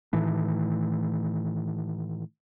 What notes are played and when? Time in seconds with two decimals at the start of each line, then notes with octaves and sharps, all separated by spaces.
0.13 A2 D#3 E3 A3